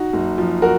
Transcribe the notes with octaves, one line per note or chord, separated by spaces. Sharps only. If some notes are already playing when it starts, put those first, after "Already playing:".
Already playing: D#4 F#4
F#1
F3
F#4 A#4